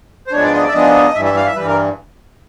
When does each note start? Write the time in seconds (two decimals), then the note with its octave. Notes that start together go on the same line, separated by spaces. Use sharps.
0.27 C5
0.32 G#2 F3 G#3 B3 D4 C#5
0.42 D5
0.53 D#5
0.63 D5
0.68 E5
0.74 G#2 F3 G#3 B3 D4 D#5
1.15 G2 E3 G3 E5
1.25 E5
1.36 F5
1.46 E5
1.56 G2 E3 G3 B4
1.67 A#4